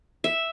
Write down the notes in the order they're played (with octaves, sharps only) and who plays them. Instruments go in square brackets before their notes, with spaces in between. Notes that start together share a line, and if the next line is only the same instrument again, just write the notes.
[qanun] E5